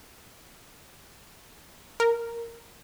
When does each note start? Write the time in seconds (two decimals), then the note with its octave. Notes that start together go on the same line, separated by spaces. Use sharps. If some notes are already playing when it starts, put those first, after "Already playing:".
2.00 A#4